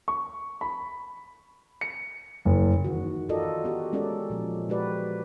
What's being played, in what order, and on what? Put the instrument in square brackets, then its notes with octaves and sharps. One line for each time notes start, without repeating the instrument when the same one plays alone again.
[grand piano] C#6
B5
C#7
F#1
[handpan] D#3 E3 F#4
F4 F#4 A4 A#4 D5 D#5
B3 F#4 G4
G#3 C#4 A4 A#4 D5
A#2 F3
G#3 F#4 G4 B4 D5